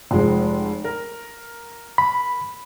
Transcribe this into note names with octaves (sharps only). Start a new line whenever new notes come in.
F1 F3 G#3
A#4
B5